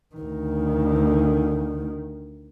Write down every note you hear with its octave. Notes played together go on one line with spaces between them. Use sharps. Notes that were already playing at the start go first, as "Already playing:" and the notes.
D2 D#3